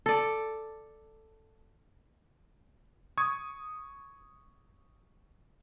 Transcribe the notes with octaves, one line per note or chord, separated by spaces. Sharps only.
A4 D5
C#6 D#6 G#6